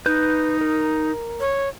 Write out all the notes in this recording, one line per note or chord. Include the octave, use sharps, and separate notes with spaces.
D#4 B4 G6
A#4
C#5